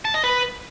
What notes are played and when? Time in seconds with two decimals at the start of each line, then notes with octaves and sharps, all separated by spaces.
0.05 A5
0.14 D#5
0.24 B4